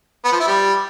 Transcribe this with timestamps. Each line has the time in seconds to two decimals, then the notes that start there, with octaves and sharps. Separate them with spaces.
0.25 B3
0.32 F3
0.40 E4
0.48 G3